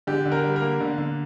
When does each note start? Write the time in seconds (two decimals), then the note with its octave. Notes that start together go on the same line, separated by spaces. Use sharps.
0.07 D3 G4
0.26 D3
0.32 A#4
0.44 G3
0.56 A#4
0.62 A#3
0.80 D3
0.98 D3